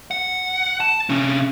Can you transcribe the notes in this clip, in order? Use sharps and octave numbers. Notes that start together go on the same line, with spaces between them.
F#5
A5
C3 C#4